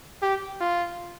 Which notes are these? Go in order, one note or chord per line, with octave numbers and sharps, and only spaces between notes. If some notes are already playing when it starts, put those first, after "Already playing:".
G4
F4